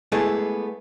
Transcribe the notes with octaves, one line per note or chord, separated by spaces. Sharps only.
G#3 A3 B3 E4 G#4